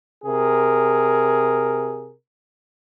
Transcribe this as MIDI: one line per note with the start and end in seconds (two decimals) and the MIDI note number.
0.25 2.13 48
0.25 2.13 68
0.25 2.13 70